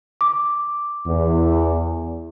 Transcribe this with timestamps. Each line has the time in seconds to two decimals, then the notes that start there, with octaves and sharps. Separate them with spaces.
0.21 D6
1.07 E2